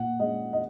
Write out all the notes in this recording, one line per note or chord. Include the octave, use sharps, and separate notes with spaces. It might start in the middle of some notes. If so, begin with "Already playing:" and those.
Already playing: A#2 F#5
G#3 C#4 D#5
D#5